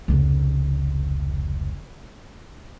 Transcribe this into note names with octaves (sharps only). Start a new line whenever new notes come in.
F1 C#2